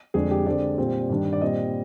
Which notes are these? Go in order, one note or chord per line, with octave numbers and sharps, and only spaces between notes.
F2 D3 G#3 D4 G#4
G4
D3 G#3 C4 D5
A#2 G3 C4
G2 D#3 G3 D4
D5
A#2 G3 C4 D#5